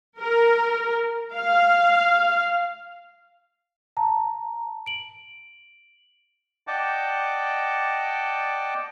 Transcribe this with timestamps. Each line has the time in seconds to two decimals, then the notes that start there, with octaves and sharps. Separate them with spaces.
0.20 A#4
1.33 F5
3.97 A5 A#5
4.86 D7 F#7
6.67 D5 D#5 F#5 G5 A5 D6